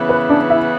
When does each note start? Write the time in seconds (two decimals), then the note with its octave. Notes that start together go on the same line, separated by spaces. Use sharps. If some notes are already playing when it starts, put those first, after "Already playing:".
Already playing: C#3 E3 B3
0.09 B4
0.29 D4 D5
0.50 E4 E5